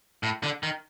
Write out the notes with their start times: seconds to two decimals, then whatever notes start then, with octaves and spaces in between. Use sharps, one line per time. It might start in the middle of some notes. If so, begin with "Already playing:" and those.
0.23 A2
0.43 D3
0.63 D#3